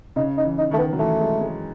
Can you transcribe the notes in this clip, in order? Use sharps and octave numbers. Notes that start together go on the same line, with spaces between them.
C#3 D#4
D#4
E3
D#4
D#3 A3
B3
F#3
E3 A3
G#3
G#3